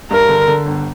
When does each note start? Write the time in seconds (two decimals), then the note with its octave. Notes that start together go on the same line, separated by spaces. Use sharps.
0.11 G2 A#4
0.29 D3
0.48 D3
0.66 G1